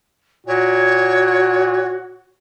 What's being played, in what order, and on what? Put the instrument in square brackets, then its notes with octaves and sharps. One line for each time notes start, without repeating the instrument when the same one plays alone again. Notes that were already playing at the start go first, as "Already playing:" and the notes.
[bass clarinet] A#2 [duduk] F#4 [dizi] C#5